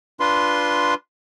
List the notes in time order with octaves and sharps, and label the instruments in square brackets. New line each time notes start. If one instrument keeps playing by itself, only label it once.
[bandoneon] D4 F4 B4 C6